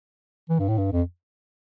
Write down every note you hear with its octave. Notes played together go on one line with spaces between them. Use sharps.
E3
G2
A2
G2
F2